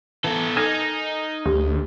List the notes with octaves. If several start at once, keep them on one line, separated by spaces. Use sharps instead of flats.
E3 B3 A4
D#4 A4 A#4 D#5 G#5 A#6
D2 G4